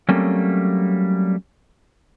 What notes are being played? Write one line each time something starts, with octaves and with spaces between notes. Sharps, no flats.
F#3 G3 A3 A#3 C4 C#4